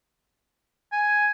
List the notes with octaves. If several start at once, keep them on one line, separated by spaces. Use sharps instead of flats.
G#5